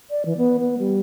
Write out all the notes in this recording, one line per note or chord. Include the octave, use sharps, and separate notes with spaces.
D5
E3
B3
B3
G3